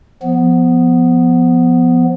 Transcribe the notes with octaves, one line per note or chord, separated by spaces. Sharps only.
F3 B3